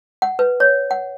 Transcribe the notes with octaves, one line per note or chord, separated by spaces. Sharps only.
F#5
B4
C#5
F#5